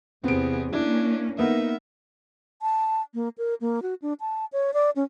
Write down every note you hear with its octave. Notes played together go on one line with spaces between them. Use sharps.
E2 C3 B3 C4 G#4 D7
A#3 C#4 D4 E4
A#3 B3 D#4 A#4 E5
A5
A#3
A#4
A#3
F#4
D4
A5
C#5
D5
C#4